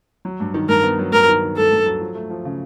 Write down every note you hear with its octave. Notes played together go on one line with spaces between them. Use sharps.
F#3
G2
D#3
G2 A#4
B3
F#3
G2 A#4
D#3
D#3
G2 A4
G2
F#3
F3
A3
F3
C#3